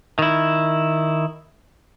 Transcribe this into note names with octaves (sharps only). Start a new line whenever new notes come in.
D#3 E4